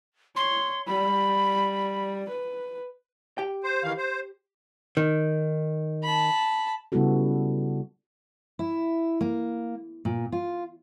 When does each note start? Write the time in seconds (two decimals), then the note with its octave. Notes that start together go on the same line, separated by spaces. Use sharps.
0.36 C#5 C6
0.87 G3 B5
2.29 B4
3.38 G4 G5
3.64 C5
3.83 D#3 E3 F5
3.98 C5
4.97 D#3
6.04 A5 B5
6.92 C#3 G3 B3 E4 F#4 A4
8.59 E4
9.21 A#3
10.05 A#2
10.32 F4